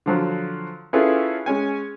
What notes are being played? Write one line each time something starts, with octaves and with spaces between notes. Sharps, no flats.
D3 F3 F#3
C#4 E4 F4 G#4 A4 B4
G#3 C#4 G#5